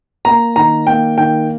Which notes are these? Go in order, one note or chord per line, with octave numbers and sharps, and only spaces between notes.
A#3 A#5
D#3 A#5
A#3 G5
D#3 G5